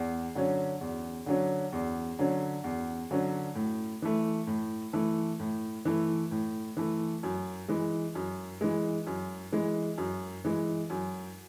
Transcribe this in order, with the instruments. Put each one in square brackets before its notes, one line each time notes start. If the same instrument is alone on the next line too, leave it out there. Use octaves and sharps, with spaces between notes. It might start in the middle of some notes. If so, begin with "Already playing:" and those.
Already playing: [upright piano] E2
D3 F#3 C#4
E2
D3 F#3 C#4
E2
D3 F#3 C#4
E2
D3 F#3 C#4
A2
E3 A3
A2
E3 A3
A2
E3 A3
A2
E3 A3
F#2
E3 G#3
F#2
E3 G#3
F#2
E3 G#3
F#2
E3 G#3
F#2